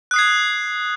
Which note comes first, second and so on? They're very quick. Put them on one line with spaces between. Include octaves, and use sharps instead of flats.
F#6 D#6 C7 G#6